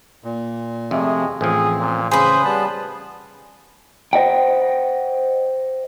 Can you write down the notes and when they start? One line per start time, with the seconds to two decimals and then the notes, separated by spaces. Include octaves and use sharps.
0.24 A#2
0.91 F2 C3 F3 G#3 A3
1.41 A1 F3 C4 G#4
1.79 A#2
2.11 C#3 G#4 B4 C5 D#6
2.45 G3 B3 A5
4.13 C5 D#5 F#5 G5